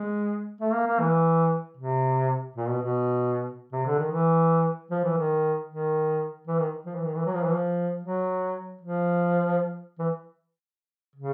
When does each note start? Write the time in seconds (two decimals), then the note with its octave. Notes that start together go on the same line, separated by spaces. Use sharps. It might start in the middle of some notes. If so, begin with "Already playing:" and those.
Already playing: G#3
0.61 A3
0.73 A#3
0.87 A#3
1.00 E3
1.77 C3
2.56 A#2
2.68 B2
2.82 B2
3.73 C3
3.86 D3
3.99 D#3
4.12 E3
4.91 F3
5.04 E3
5.17 D#3
5.69 D#3
6.47 E3
6.59 D#3
6.85 F3
6.95 E3
7.05 D#3
7.15 E3
7.26 F#3
7.34 F3
7.43 E3
7.52 F3
8.03 F#3
8.81 F3
9.99 E3
11.16 C#3